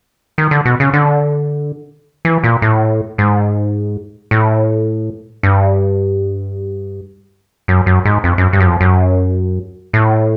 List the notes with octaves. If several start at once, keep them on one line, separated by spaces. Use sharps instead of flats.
D#3
D3
B2
C#3
D3
E3
A#2
A2
G#2
A2
G2
F#2
F#2
G#2
F2
F#2
G2
F#2
F2
F#2
A2